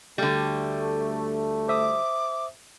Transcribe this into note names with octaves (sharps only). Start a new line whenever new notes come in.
D2 D3 G3 A3
C5 E5 D6 D#6